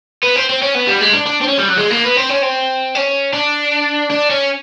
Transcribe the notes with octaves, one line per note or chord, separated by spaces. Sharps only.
B3
C4
C4
C#4
B3
G3
G#3
D4
D4
C4
C#4
G3
F#3
G#3
A#3
B3
C4
C#4
C4
C#4
D4
D4
C#4